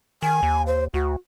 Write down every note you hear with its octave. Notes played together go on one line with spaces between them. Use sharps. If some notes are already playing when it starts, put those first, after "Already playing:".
D#3 G#5
D#2
C5
D2 F#4